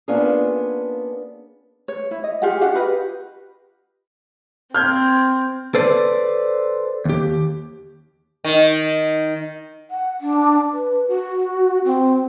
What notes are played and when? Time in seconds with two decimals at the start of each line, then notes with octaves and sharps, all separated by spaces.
0.08 A#3 B3 C#4 D4 F4 G#4
1.88 C#5
2.11 E4
2.24 D#5
2.42 F4 G4 G#4 F#5
2.61 D4 F#4 G4 F#5
2.75 F4 G4 B4 D#5
4.75 C4 F6 G6 G#6
5.75 A4 B4 C5 D5
7.05 D#2 G4
8.44 D#3
9.91 F#5
10.21 D4
10.73 B4
11.08 F#4
11.85 C4